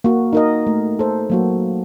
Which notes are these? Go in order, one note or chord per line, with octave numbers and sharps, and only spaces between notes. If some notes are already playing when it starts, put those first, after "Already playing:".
A#3 F#4
D#4 A#4 D#5
A3
A4 C5
F#3 A#3 F#4